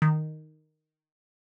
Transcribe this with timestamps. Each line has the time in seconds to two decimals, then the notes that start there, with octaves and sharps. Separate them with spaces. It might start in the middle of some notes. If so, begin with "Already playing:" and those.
0.02 D#3